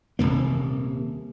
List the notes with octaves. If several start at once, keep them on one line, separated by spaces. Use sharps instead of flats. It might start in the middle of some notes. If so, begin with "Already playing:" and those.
D#1 F2 C3 A#3